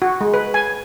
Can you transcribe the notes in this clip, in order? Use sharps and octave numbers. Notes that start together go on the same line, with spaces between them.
F#4
G#3
B4
G#5